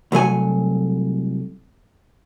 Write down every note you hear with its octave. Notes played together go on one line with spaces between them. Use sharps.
C2 F#3 A3 G#5